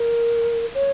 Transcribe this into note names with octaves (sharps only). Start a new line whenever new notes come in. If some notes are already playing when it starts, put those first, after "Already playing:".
Already playing: A#4
C#5